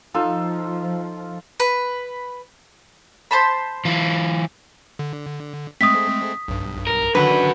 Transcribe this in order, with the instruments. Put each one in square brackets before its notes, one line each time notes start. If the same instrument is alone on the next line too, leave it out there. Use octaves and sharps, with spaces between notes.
[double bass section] F3 [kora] D#4 [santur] F4 A4
[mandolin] B4
C5 A5 B5
[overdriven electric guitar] E3 F4
[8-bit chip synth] D3
[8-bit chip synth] G#3 A3 C4 [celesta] D#6 B6
[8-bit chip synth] B1 G2
[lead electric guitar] A#4
[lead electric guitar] F#2 F#4 [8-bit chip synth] D3 D#3 D4 [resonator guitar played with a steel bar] B4